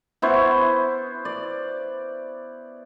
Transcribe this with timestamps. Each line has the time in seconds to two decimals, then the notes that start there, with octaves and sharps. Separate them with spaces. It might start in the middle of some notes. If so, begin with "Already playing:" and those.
0.22 B3 E4 C5 C#6
1.25 D5